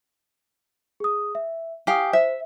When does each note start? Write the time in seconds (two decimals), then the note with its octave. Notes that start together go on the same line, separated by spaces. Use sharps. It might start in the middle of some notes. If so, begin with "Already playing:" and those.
1.00 G#4 D#6
1.35 E5
1.87 G4 F5 G#5 D#6
2.13 C5 E5